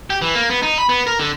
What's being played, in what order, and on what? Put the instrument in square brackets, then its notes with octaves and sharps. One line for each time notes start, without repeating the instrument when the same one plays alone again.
[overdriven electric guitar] G4
E3
A#3
B3
D#4
B5
B3
A#4
D3